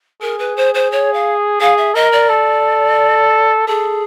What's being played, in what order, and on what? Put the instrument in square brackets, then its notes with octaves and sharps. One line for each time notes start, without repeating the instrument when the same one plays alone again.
[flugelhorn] G#4 [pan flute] A#4
[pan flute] B4
C5
C5
C#5
F5
[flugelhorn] G#4 [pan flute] F5
[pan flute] E5
[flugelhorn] A#4 [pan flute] D#5
[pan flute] D5
[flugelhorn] A4
[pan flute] G#4 [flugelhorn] A4